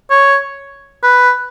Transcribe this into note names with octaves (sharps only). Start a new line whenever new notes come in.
C#5
B4